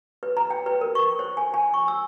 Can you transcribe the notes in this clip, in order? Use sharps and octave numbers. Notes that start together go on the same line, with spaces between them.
B4
A#5
G5
B4
A#4
C#6
C5
G#5
G#5
C#6
E6